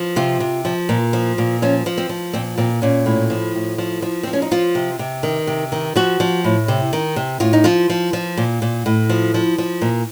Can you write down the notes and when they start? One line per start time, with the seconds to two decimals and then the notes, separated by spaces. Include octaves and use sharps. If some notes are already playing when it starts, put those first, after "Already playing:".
Already playing: F3
0.16 C3 F4
0.40 C3
0.65 F3
0.89 A#2
1.13 F3
1.38 A#2
1.62 F3 C#4
1.86 F3
1.98 C4
2.09 F3
2.33 A#2 C4
2.58 A#2 C4
2.82 A#2 C#4
3.06 A2
3.30 F3
3.55 A2
3.78 F3
4.02 F3
4.23 F3 C4
4.33 C#4
4.42 D#4
4.51 F3 F4
4.75 C3
4.99 C3
5.23 D#3
5.47 C3
5.72 D#3
5.96 F3 F#4
6.20 F3
6.44 A2
6.68 C3
6.93 D#3
7.16 C3
7.40 A2 F4
7.53 D#4
7.64 F3 F4
7.89 F3
8.13 F3
8.37 A#2
8.62 A#2
8.86 A2
9.09 F3
9.34 F3
9.58 F3
9.82 A#2